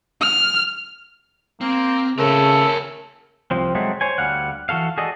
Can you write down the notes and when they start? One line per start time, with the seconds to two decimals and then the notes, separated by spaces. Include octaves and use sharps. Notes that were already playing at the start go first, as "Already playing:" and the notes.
0.21 F6
1.61 A#3 C4
2.19 C#3 A3 G#4 A#4 B4 A5
3.51 C2 F3 C4
3.75 F#3 G#3 A3 C4
4.01 C5 C#5 G#5
4.18 D2 G3 F5 F#5
4.69 E3 F#4 A4 F5
4.98 F#4 G#4 A4 D5 D#5